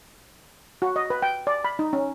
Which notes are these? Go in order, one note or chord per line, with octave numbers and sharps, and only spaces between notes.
F#4
D#5
B4
G5
D5
B5
D#4
C#4